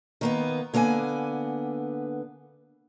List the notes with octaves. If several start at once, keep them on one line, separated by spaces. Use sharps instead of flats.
D#3 A#3 B3
D3 A#3 B3 E5 G#5